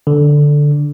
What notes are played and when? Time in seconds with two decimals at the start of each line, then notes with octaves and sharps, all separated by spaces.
0.07 D3